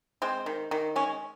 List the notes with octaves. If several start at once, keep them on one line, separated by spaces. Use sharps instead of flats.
G#3 C4 C5
D#3
D#3
G#3 C#4